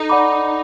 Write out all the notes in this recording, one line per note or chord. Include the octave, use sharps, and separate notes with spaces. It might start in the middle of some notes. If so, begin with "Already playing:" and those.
Already playing: D#4 A4
D5 F#5 B5 D6